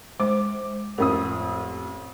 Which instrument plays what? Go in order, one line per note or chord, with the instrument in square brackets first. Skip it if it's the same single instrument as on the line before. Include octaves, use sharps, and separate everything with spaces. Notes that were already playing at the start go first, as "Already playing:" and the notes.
[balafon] G#3 C5 [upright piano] D6
[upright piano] A1 F2 D#6 [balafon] A#4